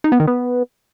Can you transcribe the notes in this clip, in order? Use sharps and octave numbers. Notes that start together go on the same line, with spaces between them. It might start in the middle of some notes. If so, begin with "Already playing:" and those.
D#4
B3
D#3
B3